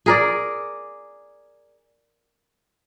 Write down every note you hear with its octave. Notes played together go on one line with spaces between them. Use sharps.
G#4 A#4 D5